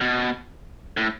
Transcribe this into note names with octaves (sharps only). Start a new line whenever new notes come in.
B2
A2